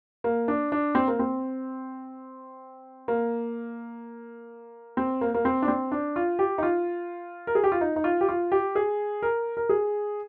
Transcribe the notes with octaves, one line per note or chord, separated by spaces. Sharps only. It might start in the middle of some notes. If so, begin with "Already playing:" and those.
A#3
D4
D4
C4
A#3
C4
A#3
C4
A#3
A#3
C4
D4
C4
D4
F4
G4
D#4
F4
A#4
G#4
G4
F4
D#4
D#4
F4
G4
F4
G4
G#4
A#4
A#4
G#4